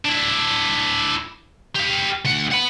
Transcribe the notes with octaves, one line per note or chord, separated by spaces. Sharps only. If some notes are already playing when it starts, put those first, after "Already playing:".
D4 E4
G4 F5
D2 F#5
F#5 B5